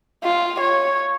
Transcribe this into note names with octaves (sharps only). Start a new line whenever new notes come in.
F4
C#5